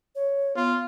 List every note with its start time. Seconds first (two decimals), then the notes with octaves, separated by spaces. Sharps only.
0.15 C#5
0.56 B3 F4